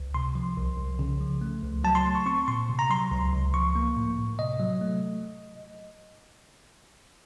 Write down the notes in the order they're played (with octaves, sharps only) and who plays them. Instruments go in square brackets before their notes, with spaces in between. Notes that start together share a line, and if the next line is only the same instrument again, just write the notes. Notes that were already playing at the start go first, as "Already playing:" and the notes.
Already playing: [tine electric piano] C#2
C3 C6
F3
C2
C2
C#3
F3
A3
C#2
F#3 A5
C6
A3
C#6
C4 C#6
A#2 C6
C3
A#5
F#3 C6
C#2
C#2
F3 C#6
A#3
A2
A2
C3 D#5
F#3
A3